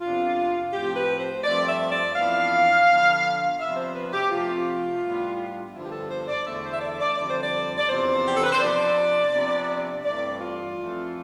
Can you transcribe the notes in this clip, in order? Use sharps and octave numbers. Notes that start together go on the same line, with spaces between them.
F2 C3 F3 B3 D4 F4
A2 F3 C4 G4
B4
C5
G2 F3 A3 C4 D5
E5
D5
F2 E3 B3 D4 F5
D3 F3 B3 D4
C3 F3 B3 D4 E5
C5
B4
G4
C3 F3 A3 C4 F4
A2 G3 B3 D4
G2 D3 F3 B3 D4 E4
G4
A4
C5
D5
E2 D3 A3 E5
C5
E5
D5
D5
F2 D3 G3 D4 D5
C5
D5
D5
E2 C3 F3 B3 D4 C5
G4
A4
B4
C5
C3 F3 B3 D4 D5
C3 F3 B3 D4
G2 E3 A3 C4 D5
F4
F2 E3 A3